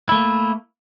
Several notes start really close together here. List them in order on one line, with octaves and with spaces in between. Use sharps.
E4 A3 A#3